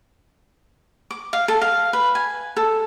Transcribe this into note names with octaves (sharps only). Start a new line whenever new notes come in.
D6
F5
A4
F5
B4
G#5
A4